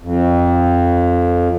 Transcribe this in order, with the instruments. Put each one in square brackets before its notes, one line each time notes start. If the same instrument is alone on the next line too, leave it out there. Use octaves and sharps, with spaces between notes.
[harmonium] F2